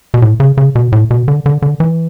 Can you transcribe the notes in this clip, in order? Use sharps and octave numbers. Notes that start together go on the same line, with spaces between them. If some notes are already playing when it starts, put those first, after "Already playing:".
B2
A2
C#3
C#3
B2
A2
B2
D3
D3
D3
E3